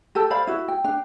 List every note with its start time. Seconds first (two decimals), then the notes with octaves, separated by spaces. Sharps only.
0.15 G4 A4 A5
0.30 C5 D5 F5 B5
0.47 E4 F#4
0.68 G5
0.84 D4 G5